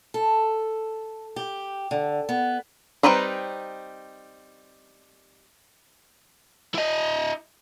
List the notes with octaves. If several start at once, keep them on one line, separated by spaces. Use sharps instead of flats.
A4
G4
D3
B3
G3 C4 D#4 B4 A#5
E4 D#5